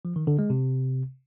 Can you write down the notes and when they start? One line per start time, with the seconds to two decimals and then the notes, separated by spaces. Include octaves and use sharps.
0.05 F3
0.16 D#3
0.27 D3
0.39 G#3
0.50 C3